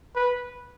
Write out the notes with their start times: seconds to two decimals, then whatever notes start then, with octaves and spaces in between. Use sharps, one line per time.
0.16 B4